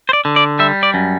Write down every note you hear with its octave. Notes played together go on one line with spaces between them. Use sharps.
C5
D5
D3
D5
G3 E5
D5
F#2